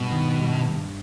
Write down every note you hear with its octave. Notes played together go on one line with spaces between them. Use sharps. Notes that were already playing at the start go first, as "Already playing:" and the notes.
Already playing: G2 B2
D#3
G2
G2